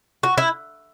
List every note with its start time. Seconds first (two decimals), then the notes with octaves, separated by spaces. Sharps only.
0.23 F#4
0.38 E4